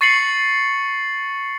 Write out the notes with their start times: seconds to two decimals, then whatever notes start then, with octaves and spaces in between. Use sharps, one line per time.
0.01 C#6 A6 C7 C#7 F#7